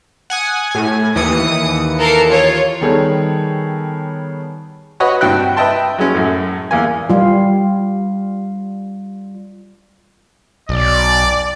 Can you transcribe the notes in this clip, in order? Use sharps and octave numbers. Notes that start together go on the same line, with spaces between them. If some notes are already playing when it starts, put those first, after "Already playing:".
F#5 G#5 D#6
A2 G#5
D#2 E3 D#6 C#7
A4 A#4 C7
F4 C#5
D#3 G3 B3 G#4 A4 C#5
F#4 B4 C#5 D#5 F#5
G2 C3 F#4 G5 F#6
B4 D#5 E5 G5 A5 C6
F#3 G#3 C#4
F#2 A2
E2 A#3 G#5
G3 F4
B1 D5